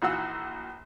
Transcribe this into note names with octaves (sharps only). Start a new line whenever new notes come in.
A#1 E3 F#4 F5 F#5 E6